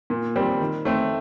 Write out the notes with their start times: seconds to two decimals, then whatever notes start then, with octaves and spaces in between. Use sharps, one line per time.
0.10 A#2
0.36 G3 C4
0.60 D#3
0.85 A3 C4